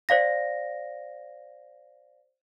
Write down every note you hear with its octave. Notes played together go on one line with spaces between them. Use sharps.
C5 D5 F5 A#6